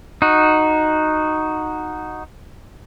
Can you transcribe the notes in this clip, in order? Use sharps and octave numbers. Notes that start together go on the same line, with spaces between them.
D#4 F#4